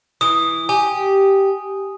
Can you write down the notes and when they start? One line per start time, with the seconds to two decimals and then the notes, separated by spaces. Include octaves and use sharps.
0.21 E3 D#6
0.69 G4 G#5